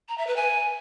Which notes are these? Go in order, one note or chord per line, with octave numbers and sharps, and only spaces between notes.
A#5
E5
B4
G#5